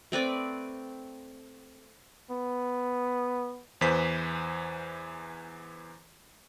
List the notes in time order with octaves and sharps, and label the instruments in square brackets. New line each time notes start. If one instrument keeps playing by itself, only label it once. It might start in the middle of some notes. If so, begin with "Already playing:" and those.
[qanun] A3 C4 B4 D5
[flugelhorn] B3
[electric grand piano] E2 E3 C5 B6